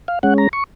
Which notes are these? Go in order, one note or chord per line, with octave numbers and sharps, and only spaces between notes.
F5
G#3 C#4 F#5
A#5
C#6